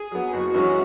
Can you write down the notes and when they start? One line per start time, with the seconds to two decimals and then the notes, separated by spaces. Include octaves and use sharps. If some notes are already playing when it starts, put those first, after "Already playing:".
Already playing: G#4
0.12 F#3 B3
0.33 F#1 F#4
0.54 F#2 E3 G#3 C#4